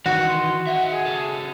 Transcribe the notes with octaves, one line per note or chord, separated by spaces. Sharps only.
D#3 E3 F#4
C6
D#4 E5 F#5
G#4
C#3 A4